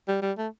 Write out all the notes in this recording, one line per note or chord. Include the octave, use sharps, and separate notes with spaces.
G3
G3
A3